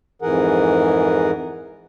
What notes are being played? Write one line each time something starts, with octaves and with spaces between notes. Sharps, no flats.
F2 G#2 E3 G#4 A#4 F#5